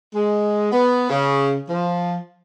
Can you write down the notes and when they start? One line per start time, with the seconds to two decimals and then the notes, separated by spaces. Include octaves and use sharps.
0.15 G#3
0.72 B3
1.10 C#3
1.69 F3